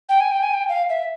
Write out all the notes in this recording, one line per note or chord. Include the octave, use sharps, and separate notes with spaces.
G5
G#5
G5
G#5
G5
F5
E5